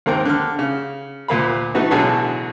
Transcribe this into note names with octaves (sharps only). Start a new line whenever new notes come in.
D#2 G#2 A#3 C4 A#4 G5
D3 F6
C#3
D2 A#2 A#3 F5 B5
E3 A3 D#4 F#4 B4
A1 B2 D3 F#3 G#4 A4